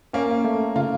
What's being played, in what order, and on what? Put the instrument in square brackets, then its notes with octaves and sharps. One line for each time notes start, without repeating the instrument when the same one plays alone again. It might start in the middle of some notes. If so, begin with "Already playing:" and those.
[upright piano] A#3 [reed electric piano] C#4
[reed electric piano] A3
[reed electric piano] C#3 [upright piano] F4